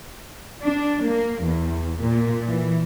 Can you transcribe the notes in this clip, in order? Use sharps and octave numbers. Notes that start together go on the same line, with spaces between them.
D4
A#3
E2
A#2
E3